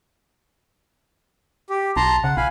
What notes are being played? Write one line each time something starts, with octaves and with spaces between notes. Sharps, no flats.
G4
B1 A5 A#5 C6
C#3 F#5
A#1 F5 G#5 B5